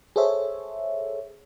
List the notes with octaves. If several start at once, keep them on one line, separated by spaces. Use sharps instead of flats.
G#4 A4 C5 C#5 E5